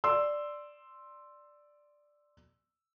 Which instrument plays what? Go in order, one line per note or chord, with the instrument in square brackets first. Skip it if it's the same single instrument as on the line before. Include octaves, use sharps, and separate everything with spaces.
[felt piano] D5 C6 E6